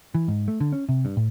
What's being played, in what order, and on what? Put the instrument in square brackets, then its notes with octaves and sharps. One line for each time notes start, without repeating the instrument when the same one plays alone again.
[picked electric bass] E3
G#2
A3
D3
C#4
C3
G2
A2